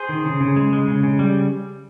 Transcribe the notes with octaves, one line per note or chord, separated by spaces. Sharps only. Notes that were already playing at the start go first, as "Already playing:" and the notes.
Already playing: G#4 C5
D#3
C#3
C#3
G#3
G#3
C#3
C#3
G3